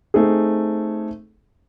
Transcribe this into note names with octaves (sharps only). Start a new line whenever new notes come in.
A3 C4 D#4 G#4